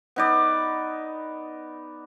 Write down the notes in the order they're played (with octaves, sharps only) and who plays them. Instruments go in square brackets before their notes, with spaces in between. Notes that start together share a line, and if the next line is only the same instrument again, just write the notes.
[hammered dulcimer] B3 D#4 D5